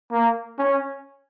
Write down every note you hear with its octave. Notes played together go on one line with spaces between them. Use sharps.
A#3
C#4